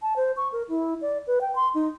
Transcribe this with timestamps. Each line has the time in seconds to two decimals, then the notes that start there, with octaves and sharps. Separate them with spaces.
0.02 A5
0.16 C5
0.36 C#6
0.52 A#4
0.69 E4
1.01 D5
1.27 B4
1.41 G5
1.55 C6
1.75 D#4